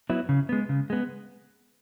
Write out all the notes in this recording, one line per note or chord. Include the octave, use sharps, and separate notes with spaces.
F#3 B3 E4
C#3
G#3 B3
C#3
G#3 B3